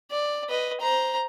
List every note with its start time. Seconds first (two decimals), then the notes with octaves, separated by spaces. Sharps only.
0.11 D5
0.49 B4 D#5
0.81 C5 A#5